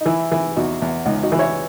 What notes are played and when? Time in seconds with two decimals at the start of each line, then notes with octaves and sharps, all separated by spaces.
0.01 D#4
0.06 E3 E4
0.32 E3
0.56 E2 D#4 F#4
0.82 E2
1.06 C#2 D#4
1.23 D#4 F#4
1.32 E3
1.39 C#5 E5